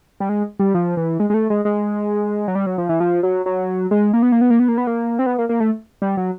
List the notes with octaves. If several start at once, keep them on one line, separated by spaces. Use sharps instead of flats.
G3
G#3
G3
F3
E3
G#3
G#3
A3
G#3
G#3
F#3
G3
F#3
F3
E3
F3
F#3
F#3
G#3
A#3
B3
A#3
B3
A#3
B3
A#3
B3
A#3
C4
B3
A#3
A#3
A3
G3
F#3